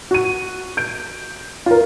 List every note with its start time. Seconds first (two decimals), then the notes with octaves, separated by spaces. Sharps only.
0.11 F#4 D#7
0.77 G6 D7
1.66 F4 A#4